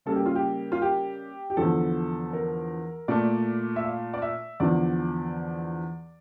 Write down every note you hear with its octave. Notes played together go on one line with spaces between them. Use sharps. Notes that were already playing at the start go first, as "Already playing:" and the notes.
C#3 G3 A#3 A4
G4
F4
G4
F4
G4
G4
E2 D3 F3 A4
A#4
A#2 A3 D5
E5
F5
D5
E5
E2 D3 F3 D5